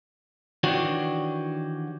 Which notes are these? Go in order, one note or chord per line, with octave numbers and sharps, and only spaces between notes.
D#3 E3 D4 F#4 G4 C#5